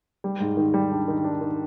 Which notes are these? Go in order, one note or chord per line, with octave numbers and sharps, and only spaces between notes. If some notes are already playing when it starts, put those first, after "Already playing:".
G3
G#2
D#3
G3
D4
D#3
D4
D#3